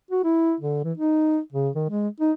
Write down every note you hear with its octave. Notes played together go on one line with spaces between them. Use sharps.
F#4
E4
D3
E3
D#4
C#3
D#3
G#3
D#4